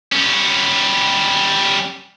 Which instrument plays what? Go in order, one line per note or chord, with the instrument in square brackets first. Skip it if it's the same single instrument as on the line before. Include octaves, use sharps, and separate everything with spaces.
[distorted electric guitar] G3 C#4